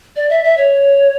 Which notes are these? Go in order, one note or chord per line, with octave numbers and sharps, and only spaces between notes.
D5
E5
E5
C#5